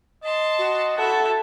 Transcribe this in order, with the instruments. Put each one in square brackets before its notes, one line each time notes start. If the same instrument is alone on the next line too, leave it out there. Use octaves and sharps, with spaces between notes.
[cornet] D#5 [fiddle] A5 C6
[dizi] F#4
[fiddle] E4 E5 [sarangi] A4 [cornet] F#5